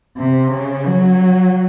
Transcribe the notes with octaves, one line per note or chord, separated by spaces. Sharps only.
C3
C#3
F#3